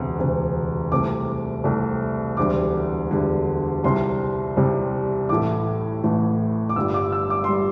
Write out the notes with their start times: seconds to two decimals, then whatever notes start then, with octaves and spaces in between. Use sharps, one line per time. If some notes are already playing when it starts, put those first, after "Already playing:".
Already playing: E1 D2 C3
0.18 E1 D2 C3
0.92 C2 C3 A3 D6
1.64 C2 C3 A3
2.37 E1 D2 D3 G3 D6
3.11 E1 D2 D3 G3
3.84 C2 C3 G3 C6
4.56 C2 C3 G3
5.29 A1 A2 A3 D6
6.04 A1 A2 A3
6.69 D6
6.76 G1 G2 G3 E6
6.94 D6
7.12 E6
7.30 D6
7.44 G3 C6